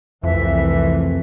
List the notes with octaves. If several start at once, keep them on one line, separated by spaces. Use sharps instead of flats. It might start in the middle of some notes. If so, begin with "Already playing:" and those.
C2 F2 E3 A3 E5